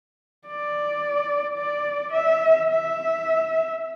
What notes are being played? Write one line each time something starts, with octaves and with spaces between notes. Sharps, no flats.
D5
D5
E5
E5